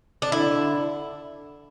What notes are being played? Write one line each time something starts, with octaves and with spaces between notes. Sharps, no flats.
D4
D3 E4